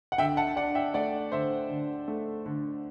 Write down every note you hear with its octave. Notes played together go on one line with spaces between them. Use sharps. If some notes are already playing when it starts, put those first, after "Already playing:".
F#5
D3 E5 G5
F#5 A5
D4 D5 F#5
E5 G5
A3 D5 F#5
D3 C5 E5
D3
A3
D3